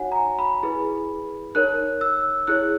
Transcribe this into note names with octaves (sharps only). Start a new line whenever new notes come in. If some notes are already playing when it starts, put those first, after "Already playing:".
Already playing: D#4 F#4 C#5 F#5 G#5
A#5
G#5
B5
E4 G#4 B4
D#4 A#4 C#5 F#6
E6
E4 G#4 C#5 F#6